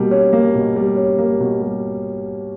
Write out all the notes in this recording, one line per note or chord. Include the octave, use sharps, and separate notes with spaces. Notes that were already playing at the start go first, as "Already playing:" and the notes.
Already playing: B2 G3 A#3
C#4
A#3
B2
G3
C#4
A#3
B2
G3